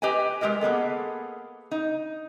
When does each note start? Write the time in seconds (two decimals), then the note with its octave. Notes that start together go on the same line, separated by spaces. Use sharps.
0.02 G4 B4 D#5 G5 G#5
0.41 G#3 B3 G4 A#4 D#5
0.61 A#3 B3 G#4 A4
1.71 D#4